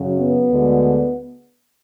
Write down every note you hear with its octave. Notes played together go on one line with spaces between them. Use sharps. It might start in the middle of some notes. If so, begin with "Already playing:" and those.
Already playing: F#2 C#3 F#3
B3
D2 D3 G#3